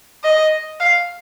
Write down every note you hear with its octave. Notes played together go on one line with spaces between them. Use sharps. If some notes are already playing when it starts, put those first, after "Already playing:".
D#5
F5